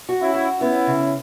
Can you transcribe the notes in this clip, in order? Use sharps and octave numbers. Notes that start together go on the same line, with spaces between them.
F#4
C#4 E4
F#4
B3 C#4 E4
C#3